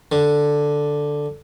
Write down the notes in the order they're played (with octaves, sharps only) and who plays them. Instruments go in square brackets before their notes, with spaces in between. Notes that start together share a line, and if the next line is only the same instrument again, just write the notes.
[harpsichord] D3